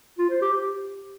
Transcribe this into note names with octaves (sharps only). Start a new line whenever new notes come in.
F4
C5
G4
G4